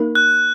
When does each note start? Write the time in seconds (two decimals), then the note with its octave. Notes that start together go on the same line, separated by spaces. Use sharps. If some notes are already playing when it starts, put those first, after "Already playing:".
Already playing: A#3 D#4 A#4
0.15 F#6